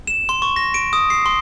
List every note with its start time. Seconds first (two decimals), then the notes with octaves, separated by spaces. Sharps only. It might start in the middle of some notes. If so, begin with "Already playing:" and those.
0.07 E7
0.29 C6
0.42 C#6
0.56 A#6
0.74 D7
0.93 D#6
1.10 C7
1.26 C6